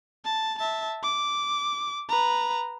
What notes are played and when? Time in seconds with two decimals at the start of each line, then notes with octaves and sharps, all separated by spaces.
0.25 A5
0.58 E5 A5
1.03 D6
2.09 B4 A#5